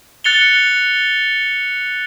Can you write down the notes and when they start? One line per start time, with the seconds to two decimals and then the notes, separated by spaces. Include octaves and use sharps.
0.24 F#6 A6 C#7 F7 G7